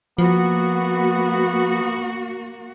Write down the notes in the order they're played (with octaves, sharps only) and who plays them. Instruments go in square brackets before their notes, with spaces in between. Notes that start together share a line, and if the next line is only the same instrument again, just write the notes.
[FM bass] F3 [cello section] A#3 F#4 [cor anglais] B3